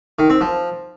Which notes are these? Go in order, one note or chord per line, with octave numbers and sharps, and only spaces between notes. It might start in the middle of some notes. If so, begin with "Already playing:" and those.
D#3
C4
F3